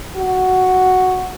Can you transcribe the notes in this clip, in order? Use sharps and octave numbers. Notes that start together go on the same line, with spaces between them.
F#4